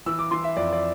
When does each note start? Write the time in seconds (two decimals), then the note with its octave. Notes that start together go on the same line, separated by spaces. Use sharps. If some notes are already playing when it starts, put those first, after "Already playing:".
0.06 E3 E6
0.19 D6
0.31 E3 C6
0.44 E5
0.56 F2 D5
0.73 D5